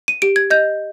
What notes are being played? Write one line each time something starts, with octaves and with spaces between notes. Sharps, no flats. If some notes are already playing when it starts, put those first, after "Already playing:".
D#7
G4 D7
G#6
D#5 G6